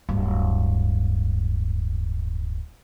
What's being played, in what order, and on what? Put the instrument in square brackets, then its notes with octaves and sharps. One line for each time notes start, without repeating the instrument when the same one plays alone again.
[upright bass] D1 G2